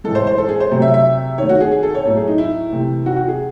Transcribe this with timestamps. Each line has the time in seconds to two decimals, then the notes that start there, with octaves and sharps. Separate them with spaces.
0.04 A2 E3 G#3 A4
0.15 C5
0.27 C5
0.38 A4
0.49 G#4
0.60 C5
0.71 C3 F#3 A3
0.82 E5
0.94 E5
1.38 D#3 A3 C#5
1.49 F#4
1.60 G#4
1.72 G#4
1.83 A4
1.94 C#5
2.05 A2 F#3 A3 A4
2.16 G#4
2.28 D#4
2.38 E4
2.72 C3 E3 A3
3.06 F#4
3.16 F#4
3.28 G#4